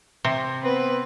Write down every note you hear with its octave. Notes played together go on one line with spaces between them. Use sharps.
C3
B3 C4 B4